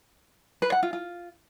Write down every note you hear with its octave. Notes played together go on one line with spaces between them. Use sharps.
B4
F#5
F4
F4